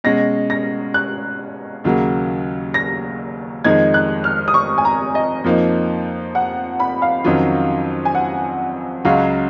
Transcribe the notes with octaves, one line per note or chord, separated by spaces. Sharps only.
B2 G#3 C#4 A#6
A#6
F#6
D#2 C#3 F#3 A#3
A#6
F2 D#3 G#3 D#4 G#6
F#6
F6
D#6
C#6
G#5
A#5
D#5
F2 F3 A#3 D#4
F#5
B5
F5
F2 D#3 F#3 C#4 F4
G#5
F#5
C#2 C#3 F#3 C#4 F#4 F5